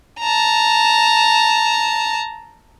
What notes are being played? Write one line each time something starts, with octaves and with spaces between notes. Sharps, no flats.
A5 A#5